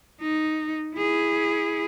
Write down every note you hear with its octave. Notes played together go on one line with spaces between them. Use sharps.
D#4
E4 G#4